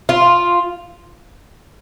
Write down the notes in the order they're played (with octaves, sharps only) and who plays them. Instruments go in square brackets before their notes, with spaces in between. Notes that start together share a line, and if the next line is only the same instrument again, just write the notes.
[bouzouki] F4